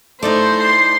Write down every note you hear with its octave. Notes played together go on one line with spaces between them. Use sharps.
A3 D#4 E4 C5 D5
C6